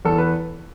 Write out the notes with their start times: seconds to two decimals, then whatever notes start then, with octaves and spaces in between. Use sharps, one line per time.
0.05 E2 A4
0.18 B4